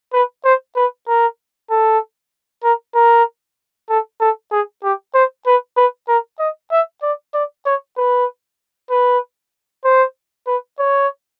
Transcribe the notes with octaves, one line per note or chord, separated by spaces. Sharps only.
B4
C5
B4
A#4
A4
A#4
A#4
A4
A4
G#4
G4
C5
B4
B4
A#4
D#5
E5
D5
D5
C#5
B4
B4
C5
B4
C#5